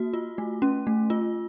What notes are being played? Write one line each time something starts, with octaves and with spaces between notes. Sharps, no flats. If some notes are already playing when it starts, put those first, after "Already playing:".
Already playing: A#3 F#4
F4
A3
C#4
A3
F4